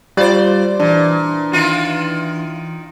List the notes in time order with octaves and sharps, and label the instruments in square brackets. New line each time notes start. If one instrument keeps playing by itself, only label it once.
[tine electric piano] G3 F4 [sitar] C5 D5
[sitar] A#2 [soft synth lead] E3 [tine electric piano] D4
[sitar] D#3 E4 F4